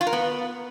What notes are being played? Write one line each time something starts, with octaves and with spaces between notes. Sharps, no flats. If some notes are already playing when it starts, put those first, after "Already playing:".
F4
A#4
B3